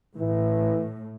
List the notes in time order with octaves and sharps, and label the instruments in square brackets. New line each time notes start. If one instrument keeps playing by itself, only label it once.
[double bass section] A2 [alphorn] E3